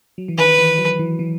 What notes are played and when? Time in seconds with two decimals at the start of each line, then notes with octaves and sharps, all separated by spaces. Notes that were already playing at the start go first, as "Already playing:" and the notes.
0.18 F#3
0.28 E3
0.38 D#3 B4
0.59 E3
0.79 F#3
0.99 E3
1.19 E3